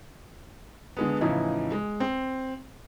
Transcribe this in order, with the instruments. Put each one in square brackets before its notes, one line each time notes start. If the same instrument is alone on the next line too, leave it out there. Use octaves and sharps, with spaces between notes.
[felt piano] D3 G#3 B3
A2 C#3 E3 F3 D#4 E4
G#3
C4